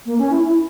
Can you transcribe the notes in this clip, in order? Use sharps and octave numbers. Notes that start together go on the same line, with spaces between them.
A#3
C#4
E4
E4